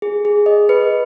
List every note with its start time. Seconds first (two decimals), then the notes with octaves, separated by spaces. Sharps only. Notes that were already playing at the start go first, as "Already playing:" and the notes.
0.02 G#4
0.25 G#4
0.46 D#5
0.69 B4